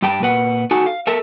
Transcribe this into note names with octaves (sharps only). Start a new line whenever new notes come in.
G2 G3 G5 A5
A#2 B4 F#5
D#4 F#4 A4 F#5 G#5 A5
F5
A4 A#4 E5 A5